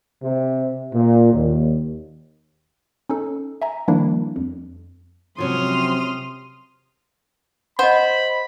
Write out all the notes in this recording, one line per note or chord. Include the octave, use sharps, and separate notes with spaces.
C3
A#2
D#2
C#4 D#4 A4
E5 G#5 A#5
D#3 F3 G3 A#3 D4 E4
F2
C3 F3 F#3 C#4 C6 D#6 F6
C5 D#5 F#5 B5